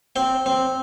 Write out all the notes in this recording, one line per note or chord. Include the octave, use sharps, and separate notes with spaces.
C4 G5
C4